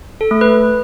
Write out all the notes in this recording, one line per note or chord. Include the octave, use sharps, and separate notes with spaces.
A4
A3
B4